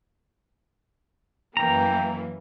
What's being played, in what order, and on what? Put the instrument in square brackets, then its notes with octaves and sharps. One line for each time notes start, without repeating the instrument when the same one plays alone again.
[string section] F#2 E3 A#3 [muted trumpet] G5 [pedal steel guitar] A#5